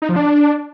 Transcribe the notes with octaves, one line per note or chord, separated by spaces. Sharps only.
D#4
F3
D4